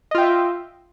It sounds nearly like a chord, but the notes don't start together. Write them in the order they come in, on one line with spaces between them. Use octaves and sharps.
D#5 F4 G5 E5